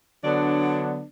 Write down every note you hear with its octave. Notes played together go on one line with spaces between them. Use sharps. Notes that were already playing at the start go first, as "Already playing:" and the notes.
D3 F#3 B3 D4